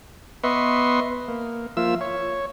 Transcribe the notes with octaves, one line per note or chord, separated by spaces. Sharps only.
B3 B4 D#5 E5 C6 C#6
A#3
F3 A#3 F4 E5 E6
C#5